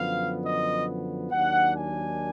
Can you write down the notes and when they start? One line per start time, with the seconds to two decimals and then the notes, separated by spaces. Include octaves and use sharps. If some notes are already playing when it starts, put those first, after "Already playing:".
Already playing: F#2 D3 F3 B3 F5
0.43 D#5
1.31 D#2 D#3 F#3 D4 F#5
1.75 G#5